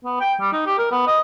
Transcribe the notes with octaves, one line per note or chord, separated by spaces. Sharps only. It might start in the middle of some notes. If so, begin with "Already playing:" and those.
B3
G5
G3
D#4
G4
A#4
B3
D#5